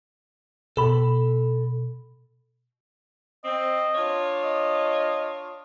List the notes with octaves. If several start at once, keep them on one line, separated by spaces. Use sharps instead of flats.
B2 A4 B5
C4 D#5
D4 F4 C#5
D#5